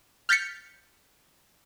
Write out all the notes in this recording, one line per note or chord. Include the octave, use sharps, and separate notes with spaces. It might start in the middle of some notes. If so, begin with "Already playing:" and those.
F6 G6 A6 B6 C#7